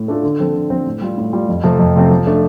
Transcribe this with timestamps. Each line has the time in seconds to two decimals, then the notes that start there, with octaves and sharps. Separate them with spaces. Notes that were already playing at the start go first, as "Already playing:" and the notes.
Already playing: A2
0.08 A3 D4 F4 A4
0.23 D3
0.39 F3 C4 A4
0.55 D3
0.70 F3 C4 A4
0.86 A2
1.02 G3 F4
1.18 A2
1.33 G3 F4
1.48 F2
1.64 C3 F3 A3 C4
1.79 F2
1.96 C3 F3 A3 C4
2.11 F3
2.27 A3 D4